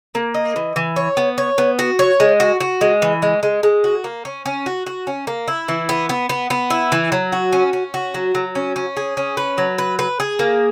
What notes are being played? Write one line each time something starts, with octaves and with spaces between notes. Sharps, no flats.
A#3
D#5
E3
E3
C#5
B3
C#5
B3
F#4
C#5
G#3
F#4
F#4
G#3
E3
G#3
G#3
G#3
F#4
A#3
C#4
C#4
F#4
F#4
C#4
A#3
E4
E3
B3
B3
B3
B3
E4
E3
F#3
F#4
C#4
C#4
F#4
F#3
F#3
C#4
C#4
G#4
C#4
B4
F#3
B4
B4
G#4
A#3